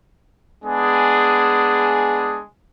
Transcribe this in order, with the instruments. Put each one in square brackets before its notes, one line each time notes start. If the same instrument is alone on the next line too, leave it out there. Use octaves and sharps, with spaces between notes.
[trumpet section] G#3 B3 D4 G#4